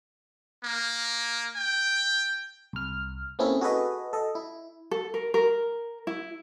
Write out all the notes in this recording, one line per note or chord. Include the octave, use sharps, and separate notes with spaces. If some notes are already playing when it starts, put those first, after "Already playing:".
A#3
G5
C2 F6
A#3 C4 C#4 E4 G#4 A4
F#4 G#4 A4 B4 D#5
A4 D#5
E4
A4
A#4
A#4
E4